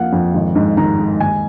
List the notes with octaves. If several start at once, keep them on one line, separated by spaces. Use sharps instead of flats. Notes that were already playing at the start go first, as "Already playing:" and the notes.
Already playing: F2 F3 A#3 F5 F#5
F2
G#1
G#2
D#3 A#5
G#3
D#2 G#5